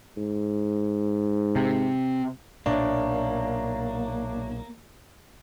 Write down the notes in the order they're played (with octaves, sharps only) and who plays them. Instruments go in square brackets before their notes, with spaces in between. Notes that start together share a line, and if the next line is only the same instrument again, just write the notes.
[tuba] G#2
[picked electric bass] C3
[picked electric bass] B1 A#2 [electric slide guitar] A#3 [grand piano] D4 [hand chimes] C#5 E5 C#6